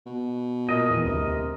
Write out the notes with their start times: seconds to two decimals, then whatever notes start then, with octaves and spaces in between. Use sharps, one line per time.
0.06 B2
0.69 A#2 A#4 D#5
0.90 E2 E3
1.05 D2 C3